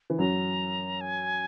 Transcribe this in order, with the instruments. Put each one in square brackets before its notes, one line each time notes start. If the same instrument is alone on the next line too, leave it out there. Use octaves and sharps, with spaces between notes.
[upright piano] E3
[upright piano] F#2 F#3 [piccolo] A#5
[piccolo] G#5